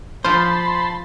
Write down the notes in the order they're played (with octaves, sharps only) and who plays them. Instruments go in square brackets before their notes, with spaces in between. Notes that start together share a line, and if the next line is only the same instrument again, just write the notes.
[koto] F3 F4 [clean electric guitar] C5 [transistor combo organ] A5 B5 C6